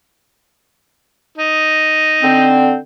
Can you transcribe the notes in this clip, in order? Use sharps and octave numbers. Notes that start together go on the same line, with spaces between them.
D#4
D3 C4